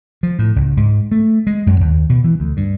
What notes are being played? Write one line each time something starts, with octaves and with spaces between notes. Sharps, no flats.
F3
A2
C#2
G#2
A3
G#3
F#2
D#2
B2
E3
D2
G2